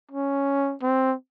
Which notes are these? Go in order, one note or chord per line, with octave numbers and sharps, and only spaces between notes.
C#4
C4